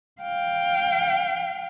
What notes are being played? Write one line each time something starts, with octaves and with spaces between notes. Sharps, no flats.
F5 G5